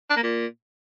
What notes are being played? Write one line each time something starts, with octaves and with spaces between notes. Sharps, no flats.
D4
A#3
A#2